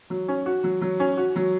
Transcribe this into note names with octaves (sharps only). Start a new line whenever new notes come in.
F#3
C#4
F#4
F#3
F#3
C#4
F#4
F#3